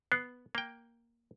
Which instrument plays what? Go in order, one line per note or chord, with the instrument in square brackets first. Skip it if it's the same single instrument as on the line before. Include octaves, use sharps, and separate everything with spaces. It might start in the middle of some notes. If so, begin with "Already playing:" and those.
[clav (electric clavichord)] B3 [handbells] F#6 C7
[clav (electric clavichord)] A#3 G5